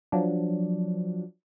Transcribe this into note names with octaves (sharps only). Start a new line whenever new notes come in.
F3 F#3 D4